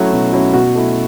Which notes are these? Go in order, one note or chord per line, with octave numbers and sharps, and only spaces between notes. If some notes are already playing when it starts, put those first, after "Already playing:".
Already playing: F#3 A3 C#4 E4 F#4
B2
F#3 A3 C#4 E4
B2 F#4
A3 E4